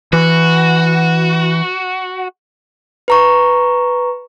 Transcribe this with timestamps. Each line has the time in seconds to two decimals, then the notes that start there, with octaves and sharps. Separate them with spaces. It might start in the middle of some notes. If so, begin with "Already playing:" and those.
0.13 E3 F#4
3.08 B4 A#5 C#6